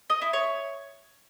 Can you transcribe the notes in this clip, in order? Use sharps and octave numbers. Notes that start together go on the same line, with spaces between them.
D#5
E4
C#5